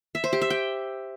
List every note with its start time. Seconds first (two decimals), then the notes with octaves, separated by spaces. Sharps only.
0.15 E5
0.24 C5
0.33 G4
0.41 E5
0.50 G5